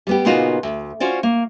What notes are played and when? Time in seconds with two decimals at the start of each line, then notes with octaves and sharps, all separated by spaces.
0.07 G3 B3 G4
0.25 A#2 C#3 B3 D#4 F4 F#4
0.63 D2
1.00 C#4 F4 F#4 C5 D5
1.23 A#3